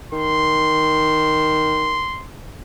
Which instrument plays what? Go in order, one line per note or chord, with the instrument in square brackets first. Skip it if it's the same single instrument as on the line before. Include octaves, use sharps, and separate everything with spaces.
[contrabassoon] D#3 [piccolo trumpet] C6